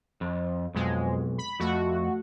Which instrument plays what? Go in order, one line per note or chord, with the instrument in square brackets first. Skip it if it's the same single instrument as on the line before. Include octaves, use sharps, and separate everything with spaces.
[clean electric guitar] F2
[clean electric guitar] B1 [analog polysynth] F2 G#3
[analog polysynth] B5
[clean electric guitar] F2 [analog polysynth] A3 F#4